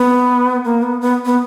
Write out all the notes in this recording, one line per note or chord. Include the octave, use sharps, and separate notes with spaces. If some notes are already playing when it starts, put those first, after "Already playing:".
Already playing: B3
A#3
B3
B3
B3